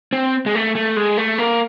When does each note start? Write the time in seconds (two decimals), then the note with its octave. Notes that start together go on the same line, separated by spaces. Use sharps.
0.13 C4
0.46 G#3
0.55 A3
0.75 A3
0.97 G#3
1.18 A3
1.38 A#3